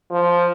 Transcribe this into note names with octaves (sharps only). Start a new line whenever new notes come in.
F3